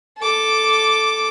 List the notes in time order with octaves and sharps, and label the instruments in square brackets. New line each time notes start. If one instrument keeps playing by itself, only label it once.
[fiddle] A4 D6